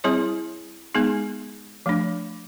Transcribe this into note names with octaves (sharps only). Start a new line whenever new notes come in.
G3 C4 E4 G#4 C#5
G#3 B3 D#4 G#4
F3 A3 D4